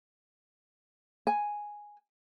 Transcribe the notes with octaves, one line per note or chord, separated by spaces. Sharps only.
G#5